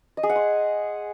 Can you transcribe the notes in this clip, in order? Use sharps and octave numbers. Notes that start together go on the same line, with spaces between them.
D#5
G#4
F#5
C6